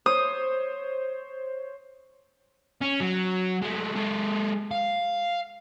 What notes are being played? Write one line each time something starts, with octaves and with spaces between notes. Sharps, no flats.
C5 C#5 D#6
C#4
F#3
G#3 A3
G#3 A4
F5